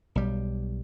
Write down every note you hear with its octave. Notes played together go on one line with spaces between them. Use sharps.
B1 G3